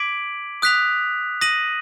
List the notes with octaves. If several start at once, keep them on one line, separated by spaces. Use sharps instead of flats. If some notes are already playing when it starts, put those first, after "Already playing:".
Already playing: D6 G#6 B6 D7 F#7
D#6 F#6 B6 F7
D#6 A#6 D#7 F#7